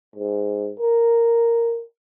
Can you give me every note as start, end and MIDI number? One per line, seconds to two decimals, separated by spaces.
0.16 0.71 44
0.79 1.82 70